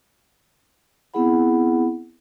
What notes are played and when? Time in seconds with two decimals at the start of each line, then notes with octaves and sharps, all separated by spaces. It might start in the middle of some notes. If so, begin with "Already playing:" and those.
1.14 B3 C4 E4 G#4 F#5 B5